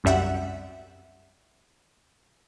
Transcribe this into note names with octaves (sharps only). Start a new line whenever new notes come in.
C2 F#2 G3 E5 F#5